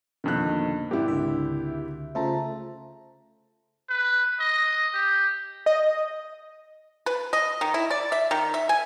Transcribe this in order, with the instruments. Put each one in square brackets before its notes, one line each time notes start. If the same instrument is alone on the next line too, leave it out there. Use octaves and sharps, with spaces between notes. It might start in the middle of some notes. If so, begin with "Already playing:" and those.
[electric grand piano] F2 D#3 [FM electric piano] B2 A#3 [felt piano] D3 F#6
[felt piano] G#1 E4 [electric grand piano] G4
[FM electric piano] C#2 D3 E5
[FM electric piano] C#3 F4 C5 [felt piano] A3 [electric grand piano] E5 A5 A#5
[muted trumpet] B4
D#5
G4
[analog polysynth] D#5
[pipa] B4
D#5
D#3
E4
D5
E5
D#3
E5
G#5